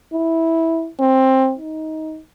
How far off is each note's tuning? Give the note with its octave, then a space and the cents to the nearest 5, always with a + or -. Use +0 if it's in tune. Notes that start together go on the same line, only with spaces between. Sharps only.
E4 -10
C4 +15
D#4 +15